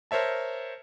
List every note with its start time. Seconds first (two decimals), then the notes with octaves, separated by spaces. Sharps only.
0.11 A#4 C5 C#5 E5 A5